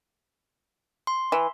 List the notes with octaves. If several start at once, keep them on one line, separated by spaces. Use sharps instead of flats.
C6
E3